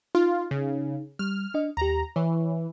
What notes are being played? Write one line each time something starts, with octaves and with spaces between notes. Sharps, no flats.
D#4 F4
C#3
G3 F6
D4 D#5
D#2 G4 A#5
E3 C#5